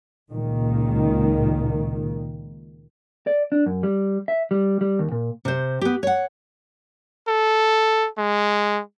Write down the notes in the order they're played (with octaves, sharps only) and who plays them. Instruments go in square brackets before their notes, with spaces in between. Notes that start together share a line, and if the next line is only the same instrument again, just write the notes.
[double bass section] C#2 A#2 D#3
[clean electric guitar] D5
D4
F#2
G3
E5
G3
G3
D#2
A#2
[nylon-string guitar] C3 C5
B3 G4
C#5 F#5
[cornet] A4
G#3